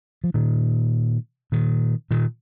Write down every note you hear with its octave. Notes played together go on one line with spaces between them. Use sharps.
F3
A#2 D#3
A#2 D#3
A#2 D#3